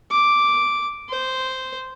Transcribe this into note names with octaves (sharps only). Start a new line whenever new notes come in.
D6
C5